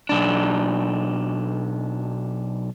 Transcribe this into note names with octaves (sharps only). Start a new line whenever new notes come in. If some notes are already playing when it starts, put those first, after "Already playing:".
B1 D4